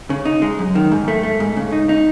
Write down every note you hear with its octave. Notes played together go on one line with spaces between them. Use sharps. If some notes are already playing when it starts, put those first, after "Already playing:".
C#3
D#4
G#3
F#2
D#3
G#2
A3
A3
G#2
C#3
D#4
D#4